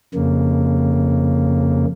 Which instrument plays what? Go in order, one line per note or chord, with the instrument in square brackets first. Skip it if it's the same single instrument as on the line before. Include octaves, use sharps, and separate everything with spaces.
[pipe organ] F2 C#3 A#3